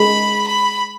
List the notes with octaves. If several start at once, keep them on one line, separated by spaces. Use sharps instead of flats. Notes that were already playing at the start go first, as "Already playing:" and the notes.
Already playing: G#3 B5
B5